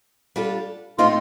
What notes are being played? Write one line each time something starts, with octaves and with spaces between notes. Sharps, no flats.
G3 D4 F4 A4
A2 A3 C4 D#4 F4